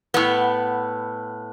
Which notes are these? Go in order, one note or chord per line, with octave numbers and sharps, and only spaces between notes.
A2 B3